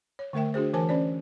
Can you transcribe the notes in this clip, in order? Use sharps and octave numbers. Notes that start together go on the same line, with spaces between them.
C#5
D3 A3 A#4 E5 G5
D4 F#4 G#4 C5
E3 A#4 C5 G#5 A5
C#4 C5 D5